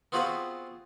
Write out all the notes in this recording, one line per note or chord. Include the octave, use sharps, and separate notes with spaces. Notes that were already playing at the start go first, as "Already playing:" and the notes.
B3 C4 F4 F#4 G#4 B4